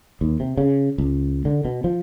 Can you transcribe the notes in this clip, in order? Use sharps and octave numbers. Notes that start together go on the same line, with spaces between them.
D#2
C3
C#3
C#2
D3
B2
F3